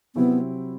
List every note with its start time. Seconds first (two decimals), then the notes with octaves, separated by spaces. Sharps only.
0.15 C3 F#3 B3 C4 E4